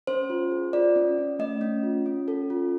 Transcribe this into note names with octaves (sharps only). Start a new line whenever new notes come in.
C#4 C5
F4
G#4
F4 D5
C#4
C#4
A3 D#5
C#4
F4
C#4
A4
F4